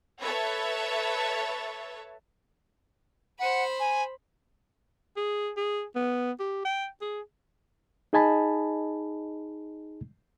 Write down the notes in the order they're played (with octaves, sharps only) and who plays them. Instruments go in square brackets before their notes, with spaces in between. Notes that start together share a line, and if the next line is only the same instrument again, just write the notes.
[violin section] A4 B4 C#5 E5 A5
[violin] C5 B5 [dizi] F#5
[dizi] G#5
[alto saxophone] G#4
G#4
B3
G4
G5
G#4
[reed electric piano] D#4 G#4 D#5 G#5 A5 B5